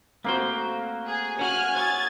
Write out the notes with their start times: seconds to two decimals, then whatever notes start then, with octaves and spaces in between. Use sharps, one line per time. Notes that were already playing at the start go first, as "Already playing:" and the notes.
0.24 A3 A#3 C4 F#4 C5
1.06 G#4
1.39 C#4 F#4 G#5 F6 F#6
1.75 C#5 D#6 E6 G#6 A6